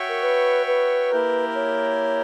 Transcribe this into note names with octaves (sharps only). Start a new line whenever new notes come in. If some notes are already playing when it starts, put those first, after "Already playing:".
Already playing: F#4 C#5 E5 G5
A#4
B4
B4
A#3 E4 G4 A#4
C#5